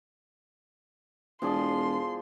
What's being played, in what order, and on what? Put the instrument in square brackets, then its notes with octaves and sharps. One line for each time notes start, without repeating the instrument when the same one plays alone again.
[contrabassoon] E1 [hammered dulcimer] F3 G#4 D5 [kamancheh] C6